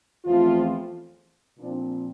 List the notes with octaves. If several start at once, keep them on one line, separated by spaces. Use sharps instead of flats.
E2 E3 F3 A3 C4 F4
A#2 F3 C4 D4